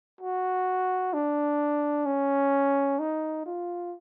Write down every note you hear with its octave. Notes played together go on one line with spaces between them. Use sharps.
F#4
D4
C#4
D#4
F4